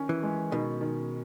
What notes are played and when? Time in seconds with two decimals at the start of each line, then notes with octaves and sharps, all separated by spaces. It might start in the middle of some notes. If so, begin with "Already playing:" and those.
Already playing: D#3 C#4
0.09 E3
0.23 G#3
0.52 B2 D#3
0.81 D#3